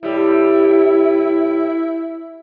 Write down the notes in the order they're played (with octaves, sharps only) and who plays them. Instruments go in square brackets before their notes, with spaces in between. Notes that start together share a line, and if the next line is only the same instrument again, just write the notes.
[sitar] A2 G3 [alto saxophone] E4